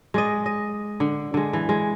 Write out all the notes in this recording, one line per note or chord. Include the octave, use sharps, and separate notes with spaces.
G#3 D5 D#5
D#5
D3
D3 G#3
E3
G#3